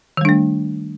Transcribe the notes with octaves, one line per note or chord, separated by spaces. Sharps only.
D#3 G3 A3 D4